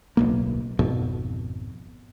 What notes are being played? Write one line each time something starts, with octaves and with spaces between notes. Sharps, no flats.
D1 B1 A#3
G#1 F2 B2